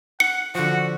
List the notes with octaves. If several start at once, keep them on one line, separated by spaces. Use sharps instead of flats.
F#5 C#7
D3 F3 F#4 F#5